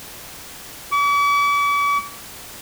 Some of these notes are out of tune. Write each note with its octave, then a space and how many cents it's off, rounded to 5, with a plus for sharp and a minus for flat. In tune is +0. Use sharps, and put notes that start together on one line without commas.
D6 -45